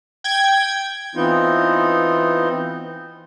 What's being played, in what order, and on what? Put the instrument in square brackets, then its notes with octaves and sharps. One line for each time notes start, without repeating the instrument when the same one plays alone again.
[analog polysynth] G5 G#6
[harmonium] E3 B3 C4 D#4 F4